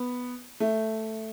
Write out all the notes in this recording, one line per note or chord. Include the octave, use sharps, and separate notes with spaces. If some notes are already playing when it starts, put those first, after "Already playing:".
Already playing: B3
A3